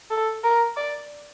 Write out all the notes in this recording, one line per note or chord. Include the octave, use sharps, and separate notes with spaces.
A4
A#4
D5